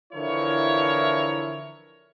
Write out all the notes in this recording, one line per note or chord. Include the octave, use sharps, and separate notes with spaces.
D3 E3 F3 E4 A#4 C#5